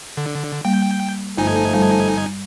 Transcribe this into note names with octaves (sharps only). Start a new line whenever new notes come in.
D3
G3 A#3 G5
G1 G2 F3 A3 D#4 A4 G#5
G3